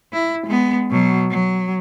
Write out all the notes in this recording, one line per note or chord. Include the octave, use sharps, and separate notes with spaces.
E4
G#3 B3
B2 F#3
F#3